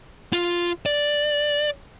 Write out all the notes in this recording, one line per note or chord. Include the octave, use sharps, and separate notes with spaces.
F4
D5